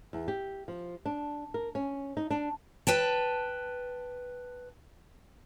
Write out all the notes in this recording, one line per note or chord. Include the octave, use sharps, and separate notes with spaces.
E2
G4
F3
D4
A#4
C#4
D#4
D4
B4 G5 A5